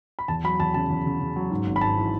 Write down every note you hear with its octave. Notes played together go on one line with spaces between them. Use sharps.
B5
E2 A5
F#3 B5
E2 A5
C#3 A5
E2
C#3
C#3
F#3
G#2
G#1
B5
G#2 A5
E3